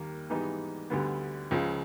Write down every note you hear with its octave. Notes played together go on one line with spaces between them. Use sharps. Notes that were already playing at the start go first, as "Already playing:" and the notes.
Already playing: D#2 D#3 G3 A#3
G#2 E3 G3 B3 D#4
D2 D3 G3 B3
C#2 C#3 F3